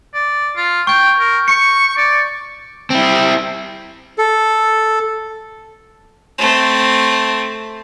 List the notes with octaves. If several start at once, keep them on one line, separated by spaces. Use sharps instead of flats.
D5
F4
G5 C#6 G6
A#4
C#6 C#7
D5
C4 E4
A4
A3 C4